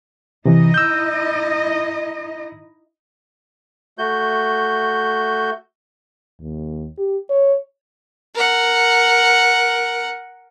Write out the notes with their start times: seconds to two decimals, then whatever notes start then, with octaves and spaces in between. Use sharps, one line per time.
0.45 C3 E3 D#4 E4 D#5
0.74 E6 G6
3.98 A3 F#4 G6
6.40 D#2
6.98 G4
7.30 C#5
8.34 A#4 F#5